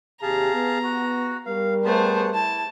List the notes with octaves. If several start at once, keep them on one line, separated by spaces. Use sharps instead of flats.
D#2 C3 G4 G#4 F5 A5 A#5
B3
F#4
G3 A#4 F5
A3 B3 G#4 C5 A5
E4 A5